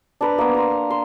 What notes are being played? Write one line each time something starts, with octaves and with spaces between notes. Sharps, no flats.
D4 B4 A#5
A#3 B3
A#5 C6
C6